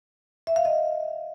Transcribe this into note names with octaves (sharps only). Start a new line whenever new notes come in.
E5
F5
D#5